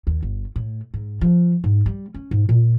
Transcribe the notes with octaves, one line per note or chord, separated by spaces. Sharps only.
D#2
G1
A2
G#2
F3
G#2
G3
C#4
G#2
A#2